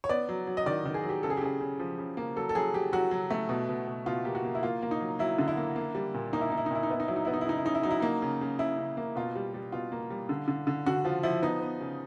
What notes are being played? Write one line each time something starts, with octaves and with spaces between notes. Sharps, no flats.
C#5
B3 D5
F#3
F#3
D#5
D#3 D5
D#3
G#4
F#3
G4
C#3 A4
G#4
G4
C#3 G#4
C#3
F3
C#3
A#3
F#3 A4
A4
F#3 G#4
F#3 G4
F#3 F#4
F#3
A3
B2
B2
B2
B2 F4
A#3 G4
F#4
A#3
E4
A#3 F4
A#3
D#4
F#3
F#3 E4
D3
E4
A#3
A#3
G3
A#2
A#3 D#4
E4
A#3 D#4
E4
D#4
A#2 E4
D#4
B3 E4
D#4
F#3 E4
D#4
B3 E4
D#4
E4
C#3 D#4
E4
C#3 D#4
E4
F#3 D#4
E4
A#3 D#4
C#3
C#3
C#3 E4
C#3
A#3
B2 F4
G3
G3
B2 F4
A#3
G3
D3
D3
D3
D3 F#4
F3 F4
F3 E4
B3 D#4
B3
C#3